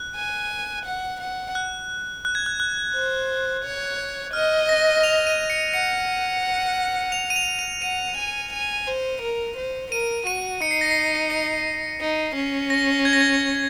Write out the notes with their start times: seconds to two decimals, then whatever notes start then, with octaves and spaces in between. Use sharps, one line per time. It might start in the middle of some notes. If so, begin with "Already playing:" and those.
Already playing: F#6
0.16 G#5
0.85 F#5
1.20 F#5
1.55 F#6
2.25 F#6
2.35 G#6
2.46 F#6
2.60 F#6
2.94 C5
3.64 C#5
4.33 D#5 F6
4.69 A#6
5.03 F7
5.27 D#7
5.50 C#7
5.73 F#5 C#7
7.12 F7
7.30 D#7
7.36 F7
7.59 D#7
7.82 F#5 D#7
8.17 G#5
8.53 G#5
8.87 C5
9.22 A#4
9.57 C5
9.91 A#4 D#7
10.26 F#4 D#7
10.61 D#4 C#7
10.71 C7
10.81 A#6
10.91 C7
11.30 C#7
12.01 D#4
12.35 C#4
12.70 A#6
13.05 G#6
13.13 A#6
13.21 G#6